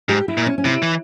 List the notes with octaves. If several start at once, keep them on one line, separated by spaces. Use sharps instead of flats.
G#2 G4
E4
A#2
C#4
C#4
C3 E4
E3